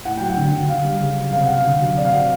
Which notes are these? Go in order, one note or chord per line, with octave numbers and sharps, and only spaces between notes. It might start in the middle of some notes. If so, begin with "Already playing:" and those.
A2 F#5
F#3 G5
F#5
D3
D3
D3 F5
G3
C#3
F#3
C3 F5
C3 F#5
F5
D3
F#3
C3 D5
F5
C3 F#5